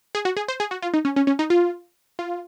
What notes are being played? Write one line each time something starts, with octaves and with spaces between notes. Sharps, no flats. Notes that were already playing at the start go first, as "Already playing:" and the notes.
G#4
F#4
G#4
C5
G#4
F#4
F4
D#4
C#4
C#4
C#4
D#4
F4
F4